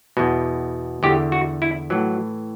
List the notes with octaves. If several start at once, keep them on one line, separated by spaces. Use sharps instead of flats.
E2 B2
E2 D3 G4
F#4
E4
A2 E3 F#3